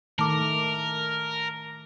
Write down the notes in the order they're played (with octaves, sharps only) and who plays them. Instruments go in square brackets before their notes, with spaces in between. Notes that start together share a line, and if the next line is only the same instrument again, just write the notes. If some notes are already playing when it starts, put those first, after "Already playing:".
[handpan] D#3 A3 [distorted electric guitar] A#4 [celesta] A5 D6